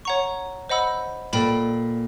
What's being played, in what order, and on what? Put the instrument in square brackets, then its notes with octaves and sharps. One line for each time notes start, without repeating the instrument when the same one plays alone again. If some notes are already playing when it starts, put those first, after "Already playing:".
[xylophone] C#5 F#5 A#5 C#6
C5 D#5 F#5 B5 E6
[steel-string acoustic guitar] A#2 [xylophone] A4 D5 G5 B5